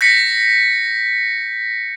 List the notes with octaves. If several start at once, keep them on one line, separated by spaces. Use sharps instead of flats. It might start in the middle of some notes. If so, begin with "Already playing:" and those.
G6 A#6 B6 C#7